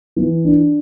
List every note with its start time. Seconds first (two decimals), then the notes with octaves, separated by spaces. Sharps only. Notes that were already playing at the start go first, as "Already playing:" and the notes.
0.16 E3
0.44 D4